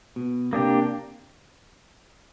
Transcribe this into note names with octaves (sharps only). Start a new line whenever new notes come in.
B2
C3 A#3 D4 G4